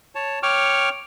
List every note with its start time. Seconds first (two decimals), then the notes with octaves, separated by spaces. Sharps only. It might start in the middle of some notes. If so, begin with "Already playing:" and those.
0.15 C#5 A5
0.43 C#5 G5 C#6 D6 F6